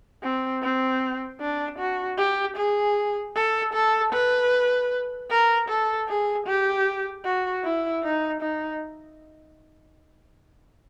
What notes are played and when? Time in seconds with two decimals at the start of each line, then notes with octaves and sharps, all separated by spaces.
0.23 C4
0.63 C4
1.41 D4
1.79 F#4
2.18 G4
2.57 G#4
3.35 A4
3.74 A4
4.13 B4
5.30 A#4
5.69 A4
6.08 G#4
6.47 G4
7.25 F#4
7.64 E4
8.03 D#4
8.41 D#4